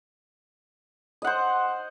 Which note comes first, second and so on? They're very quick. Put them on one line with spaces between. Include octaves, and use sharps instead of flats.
D#5 F#5 C5